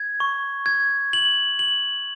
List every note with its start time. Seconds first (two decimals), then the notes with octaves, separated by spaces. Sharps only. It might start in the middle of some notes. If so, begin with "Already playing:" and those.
Already playing: G#6
0.20 C#6
0.66 G#6
1.13 F#7
1.59 F#7